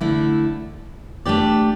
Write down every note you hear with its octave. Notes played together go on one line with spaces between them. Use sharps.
D3 A3 E4
A3 D4 G4 D5